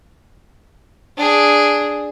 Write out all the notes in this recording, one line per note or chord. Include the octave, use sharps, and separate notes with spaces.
D4 G#4